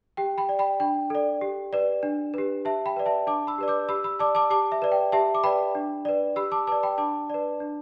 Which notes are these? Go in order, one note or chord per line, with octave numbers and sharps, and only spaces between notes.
G4 G5
G5 B5
D5
G5 B5
D4 G5
A4 D5
G4
B4 D5
D4
G4 B4
G4 E5 A5
G5 B5
B4 D5
E5 A5
D4 A5 D6
B5 E6
G4 B4 D5
D6 G6
G4 B5 E6
B5 E6
D5 A5 D6
A5 D6
G4 A5 D6
E5
B4 D5
G5
G4 E5 A5
D6
B4 D5 G5 B5
D4
B4 D5
G4 B5 E6
A5 D6
B4 D5 A5 D6
G5 B5
D4 A5 D6
B4 D5
D4